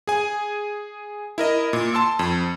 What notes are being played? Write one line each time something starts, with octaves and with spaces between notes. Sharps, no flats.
G#4 G#5
E4 A#4 D#5
A#2
A5 C6 E6
F2